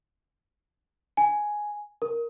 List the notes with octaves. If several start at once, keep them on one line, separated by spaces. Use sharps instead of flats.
G#5
A#4